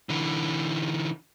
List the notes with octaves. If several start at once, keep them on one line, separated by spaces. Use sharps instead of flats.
D3 E3